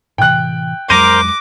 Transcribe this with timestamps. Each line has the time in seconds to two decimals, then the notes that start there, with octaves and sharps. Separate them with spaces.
0.18 A2 C3 E3 G5 F#6
0.90 F2 F#3 G#3 A#4 C5 D6 A#6 D#7